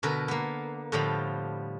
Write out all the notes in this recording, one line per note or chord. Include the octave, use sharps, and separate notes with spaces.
B2 D3 A#4 B4
A#3 B3
A2 D3 F3 G3 F5 B5